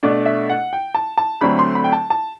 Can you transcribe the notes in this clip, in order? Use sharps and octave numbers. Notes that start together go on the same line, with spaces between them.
B2 A3 D4 D5
E5
F#5
G5
A5
A5
D2 D3 F#3 A3 C4 B5
C6
B5
G5
A5
A5